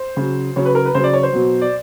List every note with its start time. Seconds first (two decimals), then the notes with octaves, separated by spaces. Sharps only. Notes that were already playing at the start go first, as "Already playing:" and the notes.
Already playing: C5
0.17 C#3 F#3
0.56 C#3 F#3 C#5
0.65 B4
0.75 A#4
0.85 B4
0.95 C#3 F#3 C5
1.04 D5
1.13 C#5
1.23 C5
1.33 B2 F#3
1.61 D5